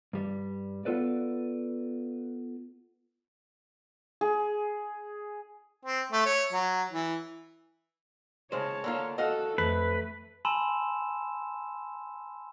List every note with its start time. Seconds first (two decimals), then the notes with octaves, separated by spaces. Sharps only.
0.13 G2 G3
0.85 B3 F4 A4 B4 D5
4.21 G#4
5.85 C4
6.12 A3
6.26 C#5
6.53 F#3
6.92 E3
8.52 C#3 G#3 C5 C#5 A5
8.84 D3 A#3 F4
9.18 F#4 A4 D#5 F5 F#5
9.58 F2 A3 B4
10.45 G#5 A5 B5 C6 E6 E7